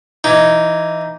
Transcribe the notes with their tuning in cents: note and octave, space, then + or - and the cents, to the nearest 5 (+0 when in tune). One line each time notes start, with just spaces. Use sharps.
E3 +15 D#4 +0